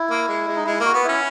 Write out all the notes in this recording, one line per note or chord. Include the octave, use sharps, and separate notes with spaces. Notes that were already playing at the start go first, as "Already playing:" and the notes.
Already playing: E4
A#3
G#3
G#3
D#4
G#3 E4
A#3 F#4
B3
C#4 E4